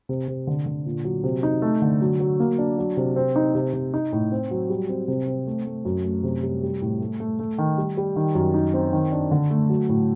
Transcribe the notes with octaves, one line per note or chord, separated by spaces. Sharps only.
C3
C3
D3
D3
A#2
F#3
C3
D#4
A3
D3
F#3
F#3
A#3
D4
F#3
C3
C4
D#4
C3
C3
D#4
A2
C4
F#3
G3
C4
C3
C4
A3
A3
F#2
A3
C3
G3
G3
A2
A3
A3
A3
D#3
G3
G3
D#3
F#2
D#4
C4
D#3
D4
D3
A3
F#3
A2